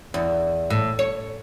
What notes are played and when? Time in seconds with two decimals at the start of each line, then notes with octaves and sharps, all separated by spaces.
0.14 E2
0.70 A2
0.99 C#5